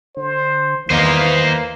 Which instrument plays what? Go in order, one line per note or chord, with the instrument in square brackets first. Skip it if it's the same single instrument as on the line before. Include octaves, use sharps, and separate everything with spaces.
[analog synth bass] D3 [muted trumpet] C5
[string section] E2 B4 F5 [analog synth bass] D#3 [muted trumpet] A#3 [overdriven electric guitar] C5 D#5
[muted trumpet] A#3